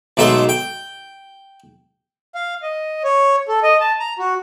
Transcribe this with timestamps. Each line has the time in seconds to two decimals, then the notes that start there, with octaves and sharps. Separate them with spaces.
0.17 B1 G#2 A3 E5 C6
0.49 G5
2.35 F5
2.63 D#5
3.04 C#5
3.48 A4
3.63 D#5
3.81 A5
4.00 A#5
4.19 F#4